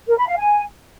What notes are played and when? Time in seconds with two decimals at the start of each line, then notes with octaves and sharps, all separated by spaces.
0.08 A#4
0.18 B5
0.27 F5
0.37 G#5